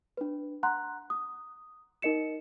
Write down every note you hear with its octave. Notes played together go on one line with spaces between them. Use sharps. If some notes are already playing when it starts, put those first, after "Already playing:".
D4 B4
F#5 A#5 C6 F#6
D#6
D#4 A#4 D#5 C#7 E7